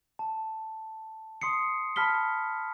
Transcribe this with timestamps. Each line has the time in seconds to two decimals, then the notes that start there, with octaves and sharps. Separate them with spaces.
0.19 A5
1.41 C6 D#6 C7 C#7
1.96 A5 B5 F6 B6 G7